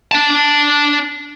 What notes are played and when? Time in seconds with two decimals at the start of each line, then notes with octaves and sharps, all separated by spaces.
0.12 D4 A5